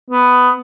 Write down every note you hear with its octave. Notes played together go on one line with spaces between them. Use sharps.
B3